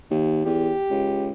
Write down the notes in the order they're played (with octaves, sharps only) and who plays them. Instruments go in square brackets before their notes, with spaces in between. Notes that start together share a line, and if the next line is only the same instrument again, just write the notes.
[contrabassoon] D#2
[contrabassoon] E2 [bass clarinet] G4
[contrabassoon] C#2